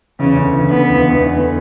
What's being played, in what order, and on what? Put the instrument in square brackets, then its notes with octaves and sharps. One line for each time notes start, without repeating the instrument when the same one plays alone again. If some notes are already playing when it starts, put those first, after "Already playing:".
[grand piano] E2 E3 [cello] C#3
[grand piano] D2 D3
E2 E3
[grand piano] D2 D3 [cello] B3
[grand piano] C#2 C#3
E2 E3
E2 E3
E2 E3
D3